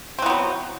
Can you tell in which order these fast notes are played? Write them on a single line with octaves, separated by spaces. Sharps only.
C4 E3 B3 F#3